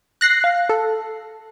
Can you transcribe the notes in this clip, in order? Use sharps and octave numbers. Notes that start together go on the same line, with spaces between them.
F#6 A#6 C7
F5
A4